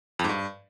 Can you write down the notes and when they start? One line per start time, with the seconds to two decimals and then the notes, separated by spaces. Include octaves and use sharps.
0.19 F2
0.24 G#2
0.29 G2